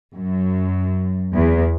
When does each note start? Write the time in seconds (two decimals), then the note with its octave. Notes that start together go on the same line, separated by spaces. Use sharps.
0.17 F#2
1.35 E2